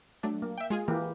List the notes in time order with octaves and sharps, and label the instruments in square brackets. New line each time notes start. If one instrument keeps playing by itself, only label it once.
[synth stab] F#3 A3 D4
[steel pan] A#3
[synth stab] E5 G5
G#3 F4 G#4
[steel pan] E3 A#3 G4